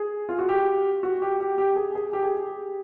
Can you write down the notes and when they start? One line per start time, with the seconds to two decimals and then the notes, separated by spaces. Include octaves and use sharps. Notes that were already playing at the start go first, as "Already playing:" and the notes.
Already playing: G#4
0.29 F4
0.39 F#4
0.49 G4
1.03 F#4
1.22 G4
1.40 G4
1.58 G4
1.76 G#4
1.95 G#4
2.13 G4
2.23 G#4
2.34 G4